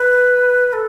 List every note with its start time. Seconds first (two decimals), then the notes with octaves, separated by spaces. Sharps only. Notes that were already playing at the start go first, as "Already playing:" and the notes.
Already playing: B4
0.73 A4